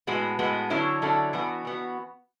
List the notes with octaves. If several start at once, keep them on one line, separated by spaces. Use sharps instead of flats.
A2 G#3 B3 F#4 B4
A2 G#3 B3 F#4 B4
D3 F#3 C#4 E4 A4
D3 F#3 C#4 E4 A4
E3 B3 F#4
E3 B3 F#4